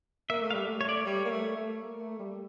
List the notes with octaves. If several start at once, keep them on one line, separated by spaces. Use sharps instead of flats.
A#3 E5
A3
F5
G3 E5
A3
C#5
D5
C#5
G3
A#3
A3
A3
A#3
A3
G3